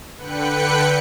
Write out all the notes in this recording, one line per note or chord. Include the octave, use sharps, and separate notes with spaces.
D3 B4 G5 F#6 C#7